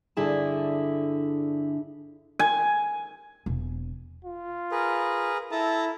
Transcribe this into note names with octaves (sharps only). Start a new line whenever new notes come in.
G2 D3 E4 G#4 A5
G#5
E1
F4
G#4 A#4 B4
E4 A4 A5 A#5